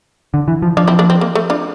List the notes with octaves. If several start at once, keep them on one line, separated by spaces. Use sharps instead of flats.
D3
E3
F3
F3 D4 F4
C4 E4
A#3 D4
C4
A#3
A3
D4 F4